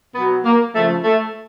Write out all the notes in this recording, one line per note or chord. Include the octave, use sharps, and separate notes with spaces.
B2 F#3 B3
A#3
C#3 F3 A3
A3